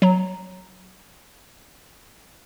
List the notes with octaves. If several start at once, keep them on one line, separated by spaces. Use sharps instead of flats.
F#3 A#5